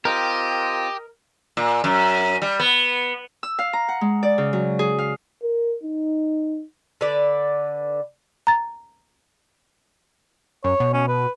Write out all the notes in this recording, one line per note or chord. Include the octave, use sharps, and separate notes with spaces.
C4 F4 G4 A#4 D#5
A#2
F#2
G3
B3
E6
F5
A#5
F#5
G#3
D5
C#3
F#3
G#4
F5
A#4
D#4
D3 B4 D5
A#5 A6
F#2 C#5
B2
C#4
B4